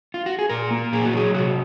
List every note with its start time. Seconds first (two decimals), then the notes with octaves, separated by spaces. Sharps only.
0.14 F4
0.26 F#4
0.39 G#4
0.49 A#2 A#4
0.71 A#3
0.92 A#2 G#4
1.05 F#4
1.13 F#3 G#4
1.34 C3 F#4